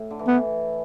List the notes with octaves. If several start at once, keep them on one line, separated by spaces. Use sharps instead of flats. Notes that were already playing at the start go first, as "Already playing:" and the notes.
Already playing: A2
D3
E3
B3